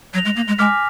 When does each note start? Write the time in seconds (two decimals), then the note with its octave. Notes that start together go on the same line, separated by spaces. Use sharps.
0.14 F#3 F#6 A#6 F7
0.25 G#3
0.36 A#3
0.48 G#3
0.58 G#3 G#5 D6 F6 B6